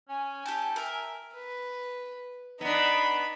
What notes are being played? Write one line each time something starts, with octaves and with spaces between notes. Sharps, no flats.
C#4 G#5
G4 A4 G5
A#4 E5
B4
B3 D4 D#4 B5